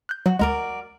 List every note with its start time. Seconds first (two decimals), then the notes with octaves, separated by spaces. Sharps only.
0.09 F#6 G6
0.26 F#3 F#4
0.39 D2 G#3 F#4 A#4 D5